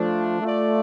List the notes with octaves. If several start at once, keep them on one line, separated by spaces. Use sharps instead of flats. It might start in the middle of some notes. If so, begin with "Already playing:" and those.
Already playing: F3 A3 D4
A3 F4 D5